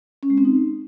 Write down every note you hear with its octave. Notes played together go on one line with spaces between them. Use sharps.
C#4
G#3
C4
D#4